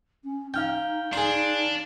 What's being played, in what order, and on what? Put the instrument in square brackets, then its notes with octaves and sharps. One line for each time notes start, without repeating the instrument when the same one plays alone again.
[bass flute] C#4
[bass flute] D#4 [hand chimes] F5 F6 G6 [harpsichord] G5
[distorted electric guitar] D4 [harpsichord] G#4 C6